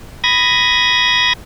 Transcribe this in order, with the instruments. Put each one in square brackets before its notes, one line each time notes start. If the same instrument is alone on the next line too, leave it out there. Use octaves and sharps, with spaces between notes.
[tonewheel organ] B5 D#6 G#6 A#6